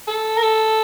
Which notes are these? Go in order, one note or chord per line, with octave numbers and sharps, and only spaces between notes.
A4
A#4
A4